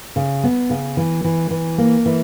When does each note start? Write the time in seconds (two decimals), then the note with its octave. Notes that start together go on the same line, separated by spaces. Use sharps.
0.16 C#3
0.44 B3
0.70 C#3
0.97 E3
1.24 E3
1.51 E3
1.78 A#3
2.06 E3